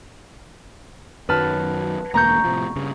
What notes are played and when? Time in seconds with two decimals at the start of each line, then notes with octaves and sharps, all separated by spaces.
1.29 F#2 D#3 F#3 B4 A5 F6
2.14 E1 D2 A#3 A#5 C#6 G6
2.44 A2 C3 F3
2.76 G2 C#3